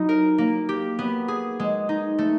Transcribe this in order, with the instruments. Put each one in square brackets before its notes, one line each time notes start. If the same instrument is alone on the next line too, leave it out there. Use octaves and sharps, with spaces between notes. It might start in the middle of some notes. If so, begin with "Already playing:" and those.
Already playing: [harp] F#3 D#4 E4
A#4
A#3
G4
B3
G#4
G#3
D#4
A3